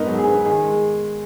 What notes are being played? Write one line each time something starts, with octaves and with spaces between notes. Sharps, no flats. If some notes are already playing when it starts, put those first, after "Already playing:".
Already playing: G#2 B3 D#4 A#4
F#3
G#4
B3
D#3 G#4
G#3